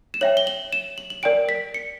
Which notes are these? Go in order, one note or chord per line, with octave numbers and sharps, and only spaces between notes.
E7
C#5 E5 G5 F#7
G7
F#7
E7
F#7
F#7
A#4 D5 G5 D7
B6
C#7